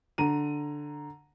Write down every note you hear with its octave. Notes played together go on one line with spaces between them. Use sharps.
D3 A#5 D#7